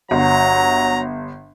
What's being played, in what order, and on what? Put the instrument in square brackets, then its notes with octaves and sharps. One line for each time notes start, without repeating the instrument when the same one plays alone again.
[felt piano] G1 [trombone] F#3 [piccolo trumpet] A#5